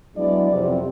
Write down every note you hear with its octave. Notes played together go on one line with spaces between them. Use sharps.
F#3 G#3 B3 D4 E4 D5
F2 C3